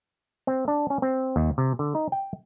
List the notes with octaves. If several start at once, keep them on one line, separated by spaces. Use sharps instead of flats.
C4
D4
C#4
C4
D#2
C3
D3
D#4
G5